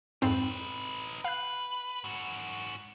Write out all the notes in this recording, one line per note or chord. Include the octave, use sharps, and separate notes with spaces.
F2 G#2 C4 D#4 B4
B4 F5 F#6
G#2 F#4